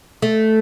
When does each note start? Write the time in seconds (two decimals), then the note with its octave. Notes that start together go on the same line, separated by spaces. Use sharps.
0.22 A3